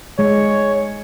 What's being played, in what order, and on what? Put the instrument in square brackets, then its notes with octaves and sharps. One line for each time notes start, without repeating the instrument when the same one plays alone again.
[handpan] G#3 [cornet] C#5